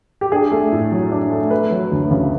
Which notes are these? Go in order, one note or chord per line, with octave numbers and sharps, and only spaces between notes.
G4
D4 G#4
A3
A2
F#3
D4
A3
A3 B4
F#3
D2
C#3